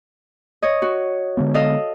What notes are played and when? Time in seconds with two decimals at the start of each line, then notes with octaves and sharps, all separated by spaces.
0.62 C#5 D#5
0.82 F#4
1.37 D3 G#3 B3
1.54 A4 D#5 F5